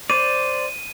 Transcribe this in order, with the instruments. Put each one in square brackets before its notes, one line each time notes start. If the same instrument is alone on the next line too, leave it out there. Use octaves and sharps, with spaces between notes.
[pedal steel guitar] C5 D5 [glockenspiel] D#7